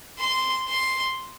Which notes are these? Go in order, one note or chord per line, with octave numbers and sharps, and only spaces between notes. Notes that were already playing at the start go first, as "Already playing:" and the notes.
C6
C6